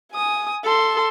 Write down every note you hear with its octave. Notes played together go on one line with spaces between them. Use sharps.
G#5 D#6
A4 C6